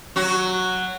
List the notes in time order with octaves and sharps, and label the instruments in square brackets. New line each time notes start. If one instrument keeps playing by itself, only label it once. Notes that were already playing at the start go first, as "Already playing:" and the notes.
[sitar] F#3 F#4